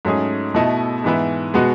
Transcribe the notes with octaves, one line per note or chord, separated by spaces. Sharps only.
G#2 F#3 A3 C#4 G#4
B2 A3 E4 A4 D#5
G#2 E3 B3 E4
B2 G#3 B3 F#4